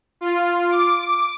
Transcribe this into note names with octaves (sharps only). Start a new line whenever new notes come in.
F4
D6